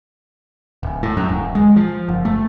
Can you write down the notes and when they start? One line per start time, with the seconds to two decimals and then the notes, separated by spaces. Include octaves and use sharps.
0.83 D1
1.03 A2
1.17 F#2
1.29 D1
1.55 G#3
1.76 F3
2.09 F#1
2.25 A3